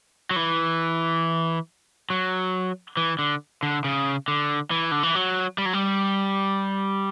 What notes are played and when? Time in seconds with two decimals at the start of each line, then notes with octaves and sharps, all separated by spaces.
0.31 F#3
0.36 E3
2.10 F#3
2.97 E3
3.19 D3
3.63 D3
3.84 C#3
4.28 D3
4.71 E3
4.91 D3
5.03 E3
5.15 F#3
5.58 G3
5.66 F#3
5.73 G3